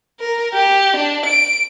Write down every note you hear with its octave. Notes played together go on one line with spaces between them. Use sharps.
A#4
G4
D4
D7